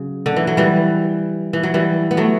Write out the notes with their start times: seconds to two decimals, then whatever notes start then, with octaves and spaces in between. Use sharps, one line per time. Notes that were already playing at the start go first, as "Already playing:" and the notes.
Already playing: C#3 F#3
0.26 D3
0.36 E3
0.47 F#3
0.57 E3 G3
1.53 E3
1.63 F#3
1.74 E3 G3
2.11 B3
2.17 F#3 A3